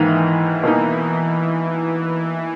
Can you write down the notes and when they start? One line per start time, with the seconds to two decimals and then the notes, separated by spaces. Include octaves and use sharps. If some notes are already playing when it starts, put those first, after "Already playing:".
Already playing: G#2 D#3 E3 A#3 D#4
0.63 B2 A#3 D#4